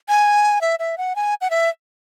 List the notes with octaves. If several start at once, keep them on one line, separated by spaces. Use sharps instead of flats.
G#5
E5
E5
F#5
G#5
F#5
E5